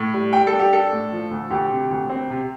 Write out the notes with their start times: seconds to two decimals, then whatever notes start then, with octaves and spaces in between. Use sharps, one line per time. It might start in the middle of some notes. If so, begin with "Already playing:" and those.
Already playing: A2
0.14 G3
0.33 G3 G5
0.47 A4
0.53 D4
0.59 G4
0.73 D4 A4
0.92 A2
1.12 F3
1.31 D2
1.50 D2 G4
1.71 C3
1.91 D2
2.09 C4
2.30 C3